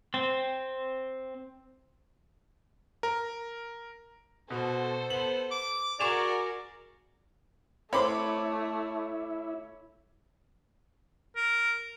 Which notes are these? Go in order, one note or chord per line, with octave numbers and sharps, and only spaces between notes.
C4
A#4
B2 F#4 A4 C5
B3 F#7
D6
F#4 G#4 A#4 D5 C#6 E7 F7
A3 C4 E4 C5 C#5 B5 D6
A#4